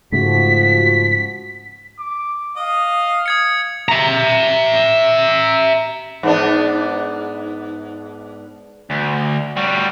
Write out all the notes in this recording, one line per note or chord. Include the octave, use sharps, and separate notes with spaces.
G#2 C#3 F3 A3 F#4 B6
D6
D#5 F5
D#6 G#6 C#7
E5 A#5
G#2 B3 D4
D2
G3 F#4